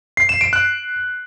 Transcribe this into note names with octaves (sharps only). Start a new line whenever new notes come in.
C7
E7
D7
F#6